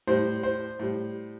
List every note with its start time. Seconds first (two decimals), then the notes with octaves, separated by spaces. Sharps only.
0.07 A2 G3 C5
0.43 C5
0.79 A2 G3